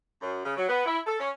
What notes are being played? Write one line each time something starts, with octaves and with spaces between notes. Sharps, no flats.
F#2
C#3
F#3
B3
E4
A4
C#4